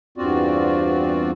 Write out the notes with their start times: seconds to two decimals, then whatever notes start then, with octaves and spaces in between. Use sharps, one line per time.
0.18 E2 G2 C4 F4 F#4 D5